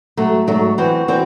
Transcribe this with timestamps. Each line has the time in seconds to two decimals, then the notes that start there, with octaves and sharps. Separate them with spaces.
0.17 G#2 F#3 A3
0.47 G#2 F#3 A3
0.78 E3 C4 F#4 C5
1.08 E3 C4 F#4 C5